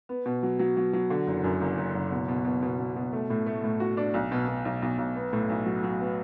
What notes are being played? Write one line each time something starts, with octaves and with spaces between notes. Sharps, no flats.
B3
B2
F#3
F#3
F#3
F#3
D3
F#1
F#2
F#1
F#1
F#1
B2
B2
B2
B2
B2
B2
A3
A2
A3
A2
F#4
D4
B1
B2
B2
B1
B1
B1
B3
A2
B1
F#3
F#3
B3